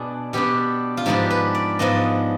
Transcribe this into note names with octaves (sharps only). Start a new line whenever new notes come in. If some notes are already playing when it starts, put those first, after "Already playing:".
Already playing: B2 B3 D4 G#4
B2 B3 D4 G4
F4
G#2 F3 B3 D4 G4
B4
D5
G#2 F3 B3 D4 D#5